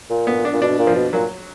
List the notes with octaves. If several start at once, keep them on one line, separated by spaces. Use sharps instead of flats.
A#2
B3
D4
A#2
B2 D4
A#2
F3
B2
A#2 F#3